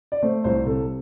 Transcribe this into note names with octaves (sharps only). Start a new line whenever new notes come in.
D5
A3 C5
C2 C5
C3 A4